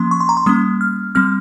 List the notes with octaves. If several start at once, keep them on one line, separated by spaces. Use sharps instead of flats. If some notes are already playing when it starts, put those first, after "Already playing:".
Already playing: F3 A#3 C#4 C6
C#6
C6
A#5
C6
G3 A#3 C#4 D#6
F6
G3 C4 F6